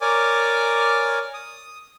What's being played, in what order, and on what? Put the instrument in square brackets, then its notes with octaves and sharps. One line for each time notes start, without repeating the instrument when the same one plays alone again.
[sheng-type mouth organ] A#4 C#5 D5 G#5 D6
D#6